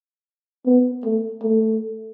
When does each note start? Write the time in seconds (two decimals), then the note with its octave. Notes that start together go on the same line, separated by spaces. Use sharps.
0.65 B3
1.04 A3
1.42 A3